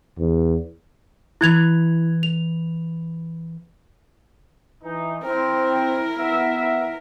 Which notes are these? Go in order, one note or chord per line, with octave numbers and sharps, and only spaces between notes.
E2
E3 E4 F#6 G#6 F7
F7
E3 D#4
C4 E4 A#4
B3 E5